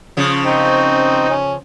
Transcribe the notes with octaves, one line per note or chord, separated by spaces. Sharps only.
C#3 F3
C4 D#4
C#4